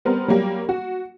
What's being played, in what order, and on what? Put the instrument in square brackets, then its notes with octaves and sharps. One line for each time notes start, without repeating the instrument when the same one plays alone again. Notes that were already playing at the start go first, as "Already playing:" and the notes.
[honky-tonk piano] G3 B3 C4 A#4
F#3 G3 A#3 G4
F#4